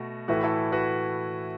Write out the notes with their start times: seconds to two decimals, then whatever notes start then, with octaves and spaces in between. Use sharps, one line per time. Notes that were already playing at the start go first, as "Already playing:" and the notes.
Already playing: B2 A3 F#4
0.28 A2 E3 A3 F#4 B4
0.43 E4 A4
0.72 F#4 B4